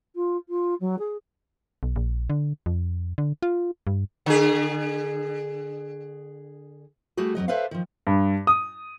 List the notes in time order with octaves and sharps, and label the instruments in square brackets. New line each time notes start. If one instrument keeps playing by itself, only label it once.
[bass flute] F4
F4
F#3
G#4
[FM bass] B1
A#1
D3
F2
D3
F4
G2
[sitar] D3 G#4
[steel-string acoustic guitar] G3 A3 F#4 G#4
F2 D#3 F#3 D#5
A4 B4 C5 D5 E5 F5
D#3 F3
[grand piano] G2
D#6